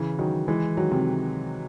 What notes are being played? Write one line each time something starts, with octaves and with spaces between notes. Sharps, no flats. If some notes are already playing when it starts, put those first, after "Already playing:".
Already playing: C#3 E3
D#3 F#3
E3 G#3
D#3 F#3
C3 D#3